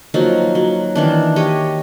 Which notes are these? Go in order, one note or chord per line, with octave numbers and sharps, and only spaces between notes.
F3 F#3 A#3 D#4
F#3
D#3 E3 D4
G4 C#5 D#5